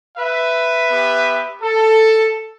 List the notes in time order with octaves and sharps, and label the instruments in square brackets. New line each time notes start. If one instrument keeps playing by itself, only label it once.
[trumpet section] B4 E5
B3 G4
A4